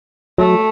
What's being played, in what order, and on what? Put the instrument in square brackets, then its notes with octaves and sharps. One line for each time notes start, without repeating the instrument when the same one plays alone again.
[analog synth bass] F#3 [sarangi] A3